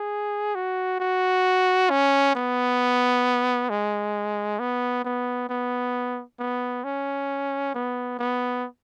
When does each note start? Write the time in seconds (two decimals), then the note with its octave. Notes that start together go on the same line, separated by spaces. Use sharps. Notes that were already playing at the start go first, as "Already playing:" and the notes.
Already playing: G#4
0.55 F#4
1.00 F#4
1.90 C#4
2.36 B3
3.70 G#3
4.60 B3
5.05 B3
5.49 B3
6.40 B3
6.84 C#4
7.75 B3
8.19 B3